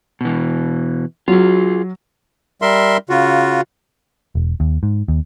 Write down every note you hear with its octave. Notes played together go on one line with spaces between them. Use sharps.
B2 E3
F#3 F4 G#4
G3 A#4 E5 C6
C#3 F4 F#4
E1
D#2
G#2
D#2